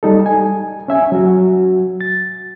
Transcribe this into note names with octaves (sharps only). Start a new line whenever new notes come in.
G3 D#4 A4
G#5
C#4 E5 G#5
F#3 F#4
A6